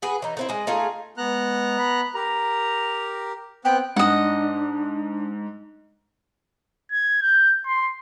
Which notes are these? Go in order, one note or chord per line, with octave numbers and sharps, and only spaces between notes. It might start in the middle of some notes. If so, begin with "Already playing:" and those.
F#4 G#4 B4
E3 D#4
A3 C4 E4
G#3 D#5
A3 D#4 F4 G#4
G#3 B3 A#5 F#6
B5
G4 A#4 A#5
B3 C4 G5 F#6
G#2 D4 D#5 F#5
G#6
G6
C6